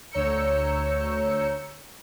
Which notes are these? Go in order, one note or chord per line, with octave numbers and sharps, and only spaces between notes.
D2 C#5 A#5 E6 G6 C#7